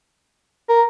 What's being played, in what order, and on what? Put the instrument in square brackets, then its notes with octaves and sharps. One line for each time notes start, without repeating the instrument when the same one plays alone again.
[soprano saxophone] A#4